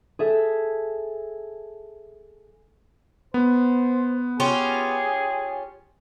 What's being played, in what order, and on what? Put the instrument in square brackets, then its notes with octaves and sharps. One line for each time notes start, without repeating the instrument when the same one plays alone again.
[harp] G#4 A4 E5
[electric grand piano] B3 [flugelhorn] C5
[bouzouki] C#4 F4 G4 [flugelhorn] G#4